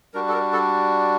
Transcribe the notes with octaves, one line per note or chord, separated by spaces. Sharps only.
G3 D4 F#4 A#4
A4
A#4
A4